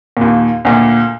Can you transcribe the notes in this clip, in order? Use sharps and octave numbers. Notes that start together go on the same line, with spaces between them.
D#2 A#2
D2 A#2